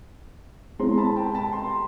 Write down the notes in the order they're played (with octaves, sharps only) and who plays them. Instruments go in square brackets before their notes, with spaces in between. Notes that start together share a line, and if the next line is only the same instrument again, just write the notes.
[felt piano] G#3 C4 E4 G#4 C5 [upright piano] A#5 C6
[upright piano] A5 B5
G5 A5
A5 B5
A#5 C6